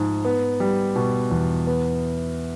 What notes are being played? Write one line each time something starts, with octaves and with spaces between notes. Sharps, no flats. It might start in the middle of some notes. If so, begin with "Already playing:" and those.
Already playing: G#2 F3
B3
G3
B2
E2
B3